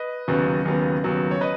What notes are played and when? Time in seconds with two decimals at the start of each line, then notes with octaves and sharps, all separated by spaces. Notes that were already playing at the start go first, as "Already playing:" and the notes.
Already playing: B4 D#5
0.28 D#2 C#3 F#3 B3
0.65 D#2 C#3 F#3 B3
1.03 D#2 C#3 F#3 B3
1.31 C#5
1.41 B4 D#5